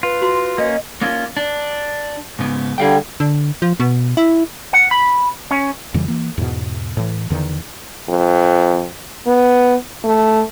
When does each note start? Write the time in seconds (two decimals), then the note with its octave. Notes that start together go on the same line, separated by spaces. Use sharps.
0.03 F4 B4
0.22 F#4 A#5 C6
0.58 A#3 C#4 D#5
1.01 A#3 C#4 F4
1.37 D4
2.39 G#2 C#3 B3
2.78 D3 G3 G#4 F5 G5
3.20 D3
3.62 F3
3.80 B2
4.17 E4
4.73 F#5
4.91 B5
5.51 C#4
5.94 F2 C#3 E3 G3
6.08 E3 A#3
6.38 E2 G#2 B2
6.97 A2 E3
7.30 E2 D3 D#3
8.08 F2
9.27 B3
10.04 A3